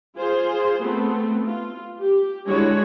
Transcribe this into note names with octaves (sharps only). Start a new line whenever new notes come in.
F4 G#4 C5
A3 B3 C4
F4
G4
D3 G#3 E4 F#4 C#5